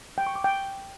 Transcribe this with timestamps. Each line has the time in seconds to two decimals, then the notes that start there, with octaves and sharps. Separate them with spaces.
0.18 G5
0.27 C#6
0.36 D6
0.44 G5